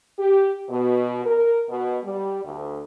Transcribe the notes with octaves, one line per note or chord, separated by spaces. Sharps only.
G4
B2
A#4
B2
G3
D2